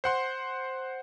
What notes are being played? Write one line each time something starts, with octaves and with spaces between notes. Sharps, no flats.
C5 F#5 C6